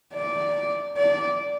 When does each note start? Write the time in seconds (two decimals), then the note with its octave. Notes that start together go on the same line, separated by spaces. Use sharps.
0.14 D5
0.97 D5